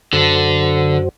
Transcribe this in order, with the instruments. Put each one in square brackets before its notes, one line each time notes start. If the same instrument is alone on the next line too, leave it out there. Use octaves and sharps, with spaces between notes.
[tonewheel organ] F#2 F#4 C5 [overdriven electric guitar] D3